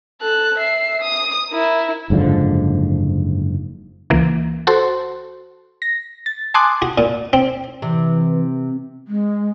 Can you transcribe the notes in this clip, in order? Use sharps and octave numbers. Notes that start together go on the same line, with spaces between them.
A4 F#6
E5 C7
D#6
E4 A#4
F#1 G#2 D3 F3
C#2 E3 A#3
F#4 A4 C5 C6
A#6
A6
G#5 A5 C6 D6 D#6 F#6
F#4
A#2
C4
C3 E3
G#3